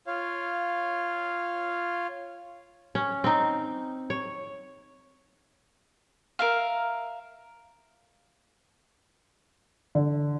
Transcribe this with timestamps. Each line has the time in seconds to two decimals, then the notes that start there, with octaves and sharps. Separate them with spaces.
0.07 F4 C#5 F5
2.95 C#4
3.24 C4 D#4
4.10 C#5
6.39 A#4 E5 F5
9.95 D3